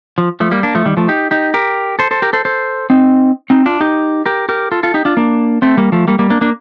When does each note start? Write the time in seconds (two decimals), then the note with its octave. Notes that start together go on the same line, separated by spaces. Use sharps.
0.18 F3
0.40 F3 A3
0.51 G3 A#3
0.63 A#3 D4
0.75 F3 A3
0.86 D#3 G3
0.97 F3 A3
1.08 D#4 G4
1.31 D#4 G4
1.54 G4 A#4
1.99 A4 C5
2.11 A4 C5
2.22 G4 A#4
2.33 A4 C5
2.45 A4 C5
2.90 C4 D#4
3.50 C4 D#4
3.66 D4 F4
3.81 D#4 G4
4.26 G4 A#4
4.49 G4 A#4
4.71 F4 A4
4.83 F4 A4
4.94 D#4 G4
5.05 D4 F4
5.17 A#3 D4
5.62 A3 C4
5.77 G3 A#3
5.92 F3 A3
6.08 G3 A#3
6.19 G3 A#3
6.30 A#3 D4
6.41 A#3 D4